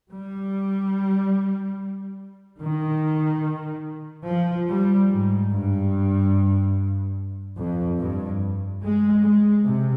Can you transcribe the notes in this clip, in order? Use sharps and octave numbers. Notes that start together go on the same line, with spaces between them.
G3
D#3
F3
G3
G#2
G2
F2
G2
G#3
G#3
C3